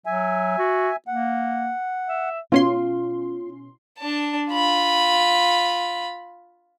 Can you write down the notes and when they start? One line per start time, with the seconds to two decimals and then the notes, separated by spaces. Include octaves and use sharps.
0.06 F#3 E5 G#5
0.58 F#4
1.08 A#3 F#5
2.08 E5
2.52 B2 C#4 F4 C6
3.99 D4 A5
4.51 F4 B5